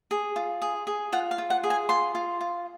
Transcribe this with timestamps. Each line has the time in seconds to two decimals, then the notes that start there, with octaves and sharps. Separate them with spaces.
0.11 G#4
0.36 F4
0.62 G#4
0.87 G#4
1.12 F4 F#5
1.31 F5
1.38 F4
1.50 F#5
1.64 G#4
1.70 G#5
1.89 F4 C6
2.15 F4
2.41 F4